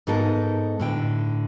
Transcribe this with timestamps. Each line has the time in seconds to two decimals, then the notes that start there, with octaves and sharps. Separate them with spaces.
0.07 G#2 B3 D#4 A4 A#4
0.80 A2 D3 G5